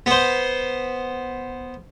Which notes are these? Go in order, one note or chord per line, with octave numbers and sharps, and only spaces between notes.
B3 C5